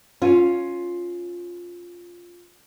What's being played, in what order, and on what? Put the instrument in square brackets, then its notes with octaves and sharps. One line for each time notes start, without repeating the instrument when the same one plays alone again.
[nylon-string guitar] C#4 F4